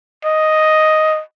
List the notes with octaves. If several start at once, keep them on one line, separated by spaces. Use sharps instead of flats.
D#5